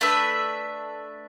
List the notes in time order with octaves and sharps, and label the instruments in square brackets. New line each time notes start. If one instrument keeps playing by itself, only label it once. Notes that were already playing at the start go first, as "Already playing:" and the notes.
[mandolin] A3 D4 B4 E5